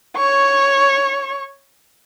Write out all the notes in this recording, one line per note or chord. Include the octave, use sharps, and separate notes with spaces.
C#5 C#6